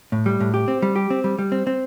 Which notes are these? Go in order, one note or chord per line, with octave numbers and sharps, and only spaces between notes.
A2
G3
A2
G4
C4
G3
G4
C4
G3
G3
C4
C4